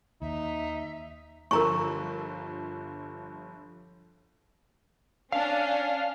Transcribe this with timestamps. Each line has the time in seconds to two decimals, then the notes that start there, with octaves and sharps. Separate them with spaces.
0.22 D#2 D#4 E5
1.51 G1 D3 F3 A#4 A#5 C#6
5.32 C#4 D4 F5